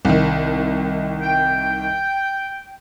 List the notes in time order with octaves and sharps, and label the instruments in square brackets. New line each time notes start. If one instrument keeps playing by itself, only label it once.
[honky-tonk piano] C2 D#3
[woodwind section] G5